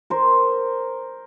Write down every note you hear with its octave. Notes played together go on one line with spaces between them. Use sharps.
A#4 C5